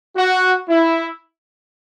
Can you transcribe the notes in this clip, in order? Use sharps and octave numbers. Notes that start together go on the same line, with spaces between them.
F#4
E4